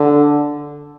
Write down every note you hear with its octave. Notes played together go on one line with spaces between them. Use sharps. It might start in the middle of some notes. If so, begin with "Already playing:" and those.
Already playing: D3